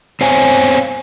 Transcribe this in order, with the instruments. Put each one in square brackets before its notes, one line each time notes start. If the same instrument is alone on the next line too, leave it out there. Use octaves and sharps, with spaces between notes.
[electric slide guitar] C4 C5 C#5 F5 G#5 A#5